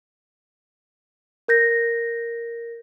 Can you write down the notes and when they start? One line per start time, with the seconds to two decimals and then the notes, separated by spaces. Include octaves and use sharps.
1.48 A#4 G6 A#6